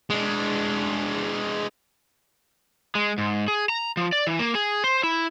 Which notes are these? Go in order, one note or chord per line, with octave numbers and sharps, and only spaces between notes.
G#3 D4
G#3
G#2
G#4
A#5
F3
D5
E3
A#3
G#4
C5
E4